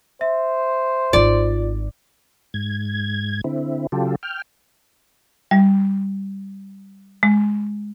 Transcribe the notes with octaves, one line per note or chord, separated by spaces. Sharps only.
C5 E5
G#1 D#4 F4 D5
G#2 G#6
D3 C4 E4
C#3 F#3 F4 G4 A4
G5 F6
G3
G#3